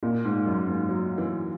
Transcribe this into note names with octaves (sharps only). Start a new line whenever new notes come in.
A#2
G#2
F#2
G#2
F#3
E3